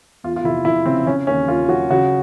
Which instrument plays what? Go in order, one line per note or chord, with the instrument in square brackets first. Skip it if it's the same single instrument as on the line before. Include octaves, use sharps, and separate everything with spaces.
[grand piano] E2 F4
F4
F1 E4
F1 E4
C#3 C4
C#3 C#4
D#2 C#4
D#2 F4
F#3 F#4
C#3 F#4